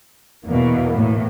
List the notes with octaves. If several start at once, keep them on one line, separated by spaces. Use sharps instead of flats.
E2 B2 E3 A#3 B3
A2